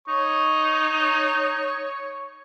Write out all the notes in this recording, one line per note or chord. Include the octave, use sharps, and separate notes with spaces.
D#4 C#5 C#6